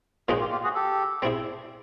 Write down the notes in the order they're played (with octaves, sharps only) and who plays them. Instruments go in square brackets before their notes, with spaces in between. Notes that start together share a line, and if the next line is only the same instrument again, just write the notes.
[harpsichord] A#2 F3 G#3 C4 D#4 [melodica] F#4 G#4
[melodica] F4 G4
F4 G4
F#4 G#4
G4 A4
[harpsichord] G3 C4 E4 G#4